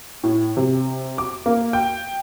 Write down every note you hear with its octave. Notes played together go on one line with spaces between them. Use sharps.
A2
C3
D6
A#3
G5